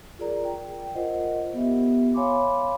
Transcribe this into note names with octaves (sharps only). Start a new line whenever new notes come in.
F4 G#4 A#4 D5 A#5
G5
F4 A#4 C5 D#5 F#5
B3 G4 E5
C#5 F5 G#5 B5 C6 D6